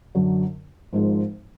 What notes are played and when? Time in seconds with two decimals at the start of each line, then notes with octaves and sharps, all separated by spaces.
0.15 F#2 D3 F#3
0.93 G#1 G#2 F3 G#3